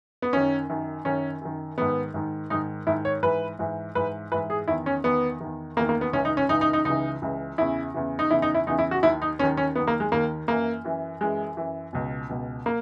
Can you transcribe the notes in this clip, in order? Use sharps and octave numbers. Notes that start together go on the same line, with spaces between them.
B3
F#2 D#3 C#4
F#2 D#3
F#2 D#3 C#4
F#2 D#3
G#2 D#3 B3
G#2 D#3
G#2 D#3 D#4
G#2 D#3 E4
C#5
G#2 E3 B4
G#2 E3
G#2 E3 B4
G#2 E3 B4
G#4
E2 D#3 E4
C#4
E2 D#3 B3
E2 D#3
E2 D#3 A#3
A#3
B3
C#2 C#3 E3 C#4
D#4
C#4
C#2 C#3 E3 D#4
D#4
D#4
C#2 C#3 E3 D#4
C#2 C#3 E3
E2 C#3 E3 E4
E2 C#3 E3
D#4
E2 C#3 E3 E4
D#4
E4
E2 C#3 E3 D#4
E4
F#4
D#2 D#3 E4
D#4
D#2 D#3 C#4
C#4
D#2 D#3 B3
A#3
G#3
D#2 D#3 A#3
F#2 E3 A#3
F#2 E3
F#2 E3 G#3
F#2 E3
C#2 B2
C#2 B2
A#3